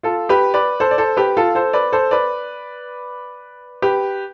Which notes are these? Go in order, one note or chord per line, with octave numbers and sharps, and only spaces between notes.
F4 A4
G4 B4
B4 D5
A4 C5
D5
A4 C5
G4 B4
F4 A4
A4 C5
B4 D5
A4 C5
B4 D5
G4 B4